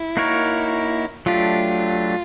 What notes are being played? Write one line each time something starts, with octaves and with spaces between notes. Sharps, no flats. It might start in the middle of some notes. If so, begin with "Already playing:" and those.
Already playing: E4
A#3 D#4 F#4 A#4 C#5
F#3 A3 D4 F4 G4